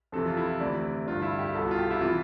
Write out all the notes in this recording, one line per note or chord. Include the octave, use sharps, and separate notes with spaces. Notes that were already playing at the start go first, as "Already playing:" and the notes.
F2 C3 E3 A4
F4
E4
D2 C3 E3 D5
G2 D3 F4
E4
G4
C2 B2 A4
F4
G4
E4
C3 E3 F4